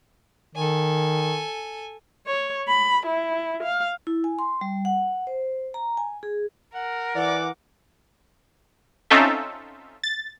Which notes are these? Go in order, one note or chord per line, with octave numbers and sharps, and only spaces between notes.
D#3 A4 G#5
C#5
B5
E4
F5
E4
G#5
C6
G3
F#5
C5
A#5
G#5
G#4
A#4 F#5
E3 D5 F#5 D6
C4 C#4 D#4 F4 A4 E5
A6